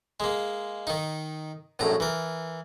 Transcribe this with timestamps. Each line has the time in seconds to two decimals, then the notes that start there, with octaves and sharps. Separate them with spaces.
0.20 G#3 A#3
0.87 D#3 D#4
1.79 A#1 F#2 A2 A#5
2.00 E3 A#4